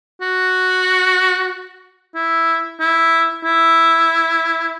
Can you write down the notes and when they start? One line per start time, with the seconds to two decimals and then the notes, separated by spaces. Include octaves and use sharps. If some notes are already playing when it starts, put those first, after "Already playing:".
0.21 F#4
2.15 E4
2.80 E4
3.44 E4